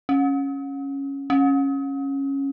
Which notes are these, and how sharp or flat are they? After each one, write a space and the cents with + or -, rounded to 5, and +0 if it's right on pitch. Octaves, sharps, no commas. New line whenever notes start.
C#4 -5
C#4 -10